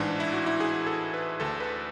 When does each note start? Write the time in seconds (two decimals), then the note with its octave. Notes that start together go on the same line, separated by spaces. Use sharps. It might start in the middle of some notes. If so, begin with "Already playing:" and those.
Already playing: A1 G#2 E3 D4
0.20 E4
0.33 F#4
0.46 E4
0.60 G#4
0.87 A4
1.14 B4
1.40 D2 D3 A4
1.60 B4